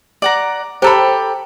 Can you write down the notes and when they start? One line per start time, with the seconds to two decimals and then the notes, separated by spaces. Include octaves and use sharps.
0.22 D5 F#5 A#5
0.82 G4 A4 C5 G5 A#5 B5